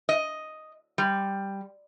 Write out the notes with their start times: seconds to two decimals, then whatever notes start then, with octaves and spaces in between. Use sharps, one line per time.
0.09 D#5
0.98 G3